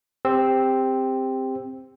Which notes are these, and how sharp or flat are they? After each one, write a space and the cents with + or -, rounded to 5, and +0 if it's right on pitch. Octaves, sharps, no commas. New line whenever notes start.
C4 +0 G4 +25 E6 -5